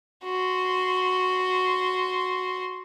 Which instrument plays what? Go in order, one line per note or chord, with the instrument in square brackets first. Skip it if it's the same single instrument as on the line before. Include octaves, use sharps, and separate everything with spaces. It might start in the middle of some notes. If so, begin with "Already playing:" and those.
[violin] F#4 C6